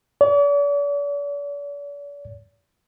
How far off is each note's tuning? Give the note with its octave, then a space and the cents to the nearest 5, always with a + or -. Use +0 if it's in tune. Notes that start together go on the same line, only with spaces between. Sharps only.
D5 -45